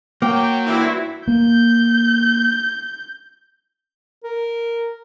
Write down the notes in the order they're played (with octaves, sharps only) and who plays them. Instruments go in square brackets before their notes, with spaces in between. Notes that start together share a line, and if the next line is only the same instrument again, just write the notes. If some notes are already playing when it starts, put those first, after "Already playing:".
[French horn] F#3 [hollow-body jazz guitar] A#3 [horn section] G5
[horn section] G2 E3 C4 [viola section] E4 F#4
[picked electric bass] A#3 [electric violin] G6
[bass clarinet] A#4